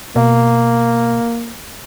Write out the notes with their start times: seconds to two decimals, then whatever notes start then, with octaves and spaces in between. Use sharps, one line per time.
0.16 B2 A#3